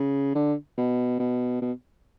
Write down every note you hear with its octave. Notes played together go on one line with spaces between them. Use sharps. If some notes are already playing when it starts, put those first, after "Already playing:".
Already playing: C#3
D3
B2
B2
B2